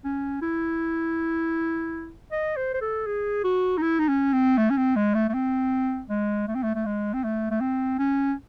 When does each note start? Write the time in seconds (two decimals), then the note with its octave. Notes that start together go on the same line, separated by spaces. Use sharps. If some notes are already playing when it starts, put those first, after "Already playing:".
0.05 C#4
0.42 E4
2.32 D#5
2.57 C5
2.74 C5
2.82 A4
3.06 G#4
3.44 F#4
3.78 D#4
3.82 E4
4.00 D#4
4.08 C#4
4.33 C4
4.58 A3
4.70 C#4
4.77 C4
4.96 G#3
5.14 A3
5.29 A3
5.34 C4
6.10 G#3
6.48 A3
6.55 C4
6.63 A3
6.75 A3
6.86 G#3
7.13 C4
7.24 A3
7.51 A3
7.61 C4
7.99 C#4